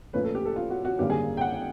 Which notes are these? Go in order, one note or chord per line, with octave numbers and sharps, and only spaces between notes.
A#2 F3 A3 C#4 B4
A4
G4
A4
F4
F#4
F#4
G#1 F#2 D3 G3 A#3 G4
G#4
G5
F#5